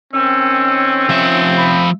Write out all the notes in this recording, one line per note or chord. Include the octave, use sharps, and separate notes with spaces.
D#3 C4 C#4 E6
F3 E5
B5